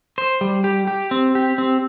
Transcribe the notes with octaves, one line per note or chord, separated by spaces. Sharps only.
C5
G3
G4
G4
C4
G4
C4